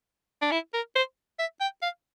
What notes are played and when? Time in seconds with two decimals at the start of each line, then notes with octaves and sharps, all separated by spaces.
0.41 D4
0.51 E4
0.74 A#4
0.95 C5
1.39 E5
1.60 G5
1.82 F5